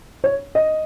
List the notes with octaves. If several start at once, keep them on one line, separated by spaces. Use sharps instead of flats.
C#5
D#5